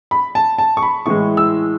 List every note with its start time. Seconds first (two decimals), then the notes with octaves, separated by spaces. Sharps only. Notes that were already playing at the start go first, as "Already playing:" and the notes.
0.11 B5
0.35 A5
0.58 A5
0.77 C#6
0.83 B5
1.06 A2 E3 G#3 C#6
1.37 E6